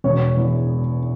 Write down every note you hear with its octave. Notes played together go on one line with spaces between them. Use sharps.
E1 C#5
E2